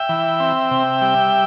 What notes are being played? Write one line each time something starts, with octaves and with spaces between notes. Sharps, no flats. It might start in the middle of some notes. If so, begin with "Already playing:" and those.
Already playing: E5 G5
E3
C4
C3
G3